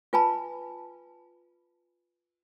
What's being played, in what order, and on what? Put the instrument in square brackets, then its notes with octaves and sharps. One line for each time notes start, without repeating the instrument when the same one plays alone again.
[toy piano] F4 B4 G#5 A5 B5